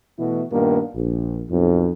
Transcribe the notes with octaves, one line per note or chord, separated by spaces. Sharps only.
B2 E3 A3 E4 F#4
G2 A#2 D#3 A#3 B3
A#1
B1 F2